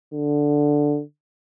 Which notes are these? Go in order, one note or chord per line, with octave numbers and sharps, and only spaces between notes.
D3